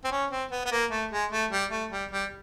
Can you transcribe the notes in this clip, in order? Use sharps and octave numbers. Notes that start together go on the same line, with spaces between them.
C4
C#4
C4
B3
B3
A#3
A3
G#3
A3
G3
A3
G3
G3